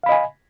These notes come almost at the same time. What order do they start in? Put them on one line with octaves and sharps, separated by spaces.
F5 B5 D#5 G#5